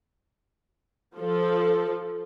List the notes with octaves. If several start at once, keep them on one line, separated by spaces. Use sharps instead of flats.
F3 A4